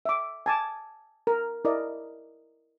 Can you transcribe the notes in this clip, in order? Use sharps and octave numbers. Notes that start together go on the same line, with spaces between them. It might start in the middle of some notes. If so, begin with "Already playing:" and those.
E5 D6
G#5 A5 D6
A#4
E4 A#4 D5 D#5